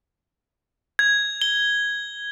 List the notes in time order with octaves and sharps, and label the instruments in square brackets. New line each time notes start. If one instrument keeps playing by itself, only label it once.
[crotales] G#6
G7